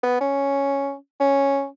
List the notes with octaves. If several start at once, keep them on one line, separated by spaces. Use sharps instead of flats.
B3
C#4
C#4